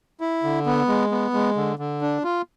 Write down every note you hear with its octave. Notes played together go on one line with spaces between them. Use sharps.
E4
D3
B3
G#3
B3
G#3
D3
D3
D4
F4